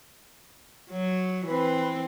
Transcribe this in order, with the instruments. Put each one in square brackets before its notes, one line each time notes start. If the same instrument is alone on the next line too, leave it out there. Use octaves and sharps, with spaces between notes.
[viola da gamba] F#3
[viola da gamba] E3 C4 [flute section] B4